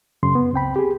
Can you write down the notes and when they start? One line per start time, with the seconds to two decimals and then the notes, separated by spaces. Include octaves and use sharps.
0.23 F#2 C#3 C6
0.35 B3
0.53 C#2 C4 G5 B5
0.76 G4 G#4